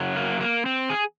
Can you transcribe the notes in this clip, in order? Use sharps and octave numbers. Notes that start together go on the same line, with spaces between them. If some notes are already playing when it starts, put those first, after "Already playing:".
Already playing: F#2 C#3 F#3
A#3
A#3
C4
G#4